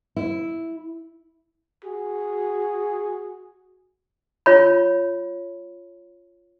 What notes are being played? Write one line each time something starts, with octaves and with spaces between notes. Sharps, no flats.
E4
F#4 G#4
F4 C#5 B5